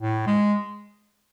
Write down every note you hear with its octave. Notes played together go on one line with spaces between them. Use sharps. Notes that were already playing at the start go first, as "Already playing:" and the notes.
A2
G#3